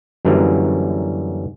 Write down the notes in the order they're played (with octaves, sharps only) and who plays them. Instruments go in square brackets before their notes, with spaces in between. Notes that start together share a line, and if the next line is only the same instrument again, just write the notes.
[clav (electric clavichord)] F#2 D3 E3 F#3 G3 A#3